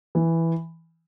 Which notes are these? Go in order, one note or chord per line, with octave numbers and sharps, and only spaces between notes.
E3